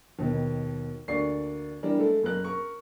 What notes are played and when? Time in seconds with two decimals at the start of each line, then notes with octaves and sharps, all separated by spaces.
0.19 D#2 B2 D#3
1.08 D2 A#3 D5 C#6 C7
1.83 E3 G3 D4 A#4
1.98 G#3 A3 A4
2.23 F#1 G#4 A#4 F#6
2.44 A#4 C#6